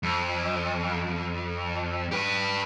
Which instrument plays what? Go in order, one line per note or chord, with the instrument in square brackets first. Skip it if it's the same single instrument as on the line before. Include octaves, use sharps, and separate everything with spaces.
[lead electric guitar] F2
G4 B4